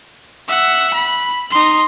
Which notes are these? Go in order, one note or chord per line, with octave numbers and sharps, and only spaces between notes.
E5 F#5
B5
D#4 C6